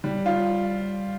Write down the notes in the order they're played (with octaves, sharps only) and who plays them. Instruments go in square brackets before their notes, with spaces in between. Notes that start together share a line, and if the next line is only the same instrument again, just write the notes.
[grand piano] G3
F4